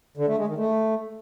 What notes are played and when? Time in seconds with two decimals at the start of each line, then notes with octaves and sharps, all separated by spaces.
0.17 D3
0.27 A3
0.38 G#3
0.48 D#3
0.58 A3